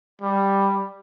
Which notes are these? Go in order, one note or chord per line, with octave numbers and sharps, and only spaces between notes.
G3